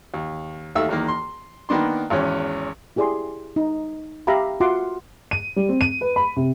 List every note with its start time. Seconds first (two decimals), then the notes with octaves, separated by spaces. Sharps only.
0.14 D#2
0.75 D#2 D#3 A3 E5 E6
0.89 E2 D#3 A#3
1.08 C6
1.69 D#3 A#3 B3 D4 C6
2.10 G#1 E2 C#4 G#5
2.96 E4 G4 G#4 D5 G#5 C6
3.56 D#4
4.27 G4 E5 F5 A#5 B5
4.60 F4 F#4 E5 F#5 C6 D6
5.31 D#7
5.56 G3
5.69 C4
5.81 D#7
6.01 B4
6.16 B5
6.36 C3